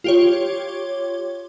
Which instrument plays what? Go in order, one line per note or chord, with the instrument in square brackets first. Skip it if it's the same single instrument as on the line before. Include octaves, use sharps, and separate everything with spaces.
[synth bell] F4 G4 C#5